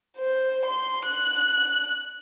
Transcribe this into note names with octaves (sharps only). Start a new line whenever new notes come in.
C5
C6
F#6